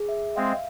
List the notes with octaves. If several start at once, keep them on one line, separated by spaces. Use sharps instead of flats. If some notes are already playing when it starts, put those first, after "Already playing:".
Already playing: G#4
E5
G#3 C4 F5